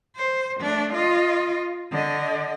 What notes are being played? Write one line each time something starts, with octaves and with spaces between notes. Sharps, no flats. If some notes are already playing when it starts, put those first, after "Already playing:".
C5
A3 D4
F4 D#5
D3 D#5